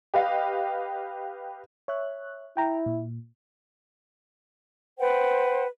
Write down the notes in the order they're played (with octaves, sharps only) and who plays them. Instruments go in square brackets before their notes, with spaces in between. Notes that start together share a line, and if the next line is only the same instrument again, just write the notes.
[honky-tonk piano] G4 B4 D#5 F5
[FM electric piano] C#5 E5 F#6
[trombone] E4 [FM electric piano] G5 A#5
[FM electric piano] A#2
[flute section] B4 C5 F#5 G5